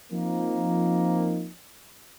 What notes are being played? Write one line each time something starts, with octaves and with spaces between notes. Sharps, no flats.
F3 A#3 C4 D#4